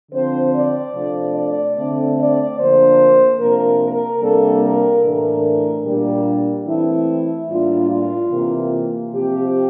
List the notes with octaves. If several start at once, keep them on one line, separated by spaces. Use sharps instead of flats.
D3 F3 C4 C5
D5
C3 F3 A3 D4
D5
D3 A3 C4
D5
D3 F3 A#3 D4 C5
C3 F3 A#3 D4 A#4
A#4
C3 G3 A#3 D4 A4
A#4
A2 E3 A3 D4 A#4
A#2 G3 A#3 D4 G4
E3 A3 C4 E4
A2 G3 A#3 D4 F4
F4
C3 E3 A#3
C3 F3 C4 G4